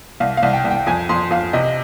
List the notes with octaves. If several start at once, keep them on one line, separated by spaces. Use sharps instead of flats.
C2 F5
F5
C2
G5
C2
G5
F2 G#5
F2 C6
F2 F5
C3 D#5